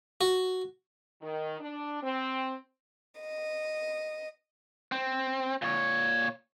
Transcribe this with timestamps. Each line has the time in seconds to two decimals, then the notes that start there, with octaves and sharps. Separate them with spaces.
0.21 F#4
1.22 D#3
1.60 D4
2.02 C4
3.21 D#5
4.92 C4
5.62 A#2 C#5